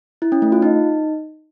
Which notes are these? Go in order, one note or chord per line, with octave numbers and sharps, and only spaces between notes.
E4
C#4
A3
F4
D#4